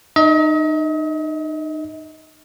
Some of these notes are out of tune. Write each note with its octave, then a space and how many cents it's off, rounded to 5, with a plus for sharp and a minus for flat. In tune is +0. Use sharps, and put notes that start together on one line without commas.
D#4 -25 D#5 +40